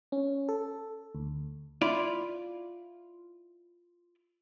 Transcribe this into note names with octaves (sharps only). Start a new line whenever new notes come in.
C#4
A4
D2
E4 F4 D5